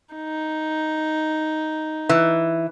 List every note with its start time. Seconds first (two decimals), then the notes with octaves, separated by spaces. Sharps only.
0.15 D#4
2.09 E3